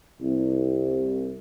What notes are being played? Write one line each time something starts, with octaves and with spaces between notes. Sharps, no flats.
C2